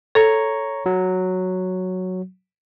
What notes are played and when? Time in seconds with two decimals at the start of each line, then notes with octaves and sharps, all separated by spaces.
0.15 A4 C#5 A#5 C#6
0.86 F#3